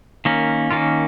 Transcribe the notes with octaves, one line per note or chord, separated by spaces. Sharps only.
D#3 A#3 C#4
D#3 A#3 C#4 F4